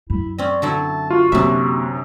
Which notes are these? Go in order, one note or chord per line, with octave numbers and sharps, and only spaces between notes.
F#2 E4
C4 C#4 D5
D3 F#3 E4 A5
F4 F#4
F#2 C3 A#3 D4 D#4 E5